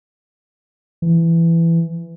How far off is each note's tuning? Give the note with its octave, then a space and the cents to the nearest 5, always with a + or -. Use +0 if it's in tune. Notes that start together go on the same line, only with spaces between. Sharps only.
E3 +15